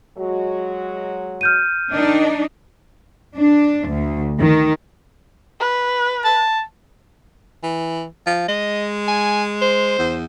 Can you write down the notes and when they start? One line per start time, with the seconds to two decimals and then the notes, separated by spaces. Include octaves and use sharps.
0.17 F#3 G#3 F#4
1.41 F6 G6 D#7
1.92 D#3 D4 D#4 D#5
3.36 D4
3.90 D2
4.39 D#3
5.60 B4
6.24 A5
7.64 E3
8.26 F3
8.48 G#3 D#5
9.08 G#5
9.61 C5
9.99 E2